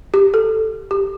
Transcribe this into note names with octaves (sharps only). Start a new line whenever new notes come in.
G4
A4
G4